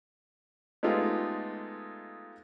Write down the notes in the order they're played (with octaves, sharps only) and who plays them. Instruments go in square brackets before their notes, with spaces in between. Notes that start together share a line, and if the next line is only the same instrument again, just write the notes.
[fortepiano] G#3 A3 B3 D#4 F4 G4